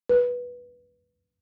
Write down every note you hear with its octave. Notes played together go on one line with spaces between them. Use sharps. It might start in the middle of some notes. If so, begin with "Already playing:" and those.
B4